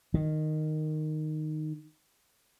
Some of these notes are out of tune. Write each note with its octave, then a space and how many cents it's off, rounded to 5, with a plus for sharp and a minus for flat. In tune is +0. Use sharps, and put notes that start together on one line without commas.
D#3 -10